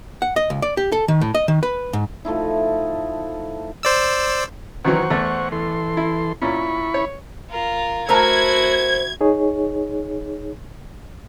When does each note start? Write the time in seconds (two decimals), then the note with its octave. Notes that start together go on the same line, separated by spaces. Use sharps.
0.22 F#5
0.36 D#5
0.50 C#2
0.62 D5
0.77 G4
0.92 A4
1.08 D#3
1.21 A2
1.35 D#5
1.48 D#3
1.63 B4
1.93 G#2
2.25 F3 A3 D#4 E4
3.83 C5 D5 E6
4.85 D#3 E3 F#3 C5 F#5 C#6
5.10 E2 A3
5.52 E3 A4 C6
5.97 E4
6.42 A#2 C#4 E4 B5 C#6
6.94 C#5
7.50 F4 A#4
8.09 A3 E4 F#4 A#4 C5 A#5 G#6
9.21 D#4 G#4 C#5